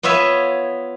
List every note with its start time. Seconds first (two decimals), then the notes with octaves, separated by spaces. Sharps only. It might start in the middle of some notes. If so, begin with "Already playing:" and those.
0.03 B3 F4 C#5 E5 G#5